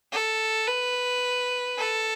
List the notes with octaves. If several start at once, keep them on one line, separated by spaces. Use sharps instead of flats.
A4
B4
A4